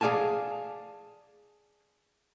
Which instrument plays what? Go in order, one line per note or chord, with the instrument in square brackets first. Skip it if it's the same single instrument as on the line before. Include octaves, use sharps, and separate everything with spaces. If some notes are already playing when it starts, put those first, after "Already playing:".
[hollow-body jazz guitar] G#4 D5 F5 G#5 A5